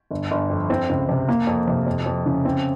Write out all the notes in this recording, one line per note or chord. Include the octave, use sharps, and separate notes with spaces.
G1
G1
F2
C4
C#2
C3
A#3
F2
C3
F2
F2
C#3
C4